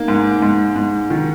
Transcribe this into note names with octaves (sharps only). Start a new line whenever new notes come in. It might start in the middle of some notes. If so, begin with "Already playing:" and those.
Already playing: A#3 D#4
G#2
G#2
G#2
D#3 D#4